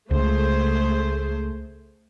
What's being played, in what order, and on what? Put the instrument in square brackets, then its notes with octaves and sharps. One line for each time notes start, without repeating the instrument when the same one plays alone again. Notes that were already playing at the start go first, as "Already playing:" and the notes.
[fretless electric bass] C#2 [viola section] A3 G#4 C5